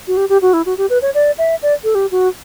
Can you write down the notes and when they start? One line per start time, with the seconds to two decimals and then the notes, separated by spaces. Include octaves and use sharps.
0.07 F#4
0.17 G4
0.29 G4
0.42 F#4
0.53 E4
0.66 F#4
0.78 G4
0.90 B4
1.02 C#5
1.14 D5
1.38 E5
1.62 D5
1.84 A4
1.95 G4
2.11 F#4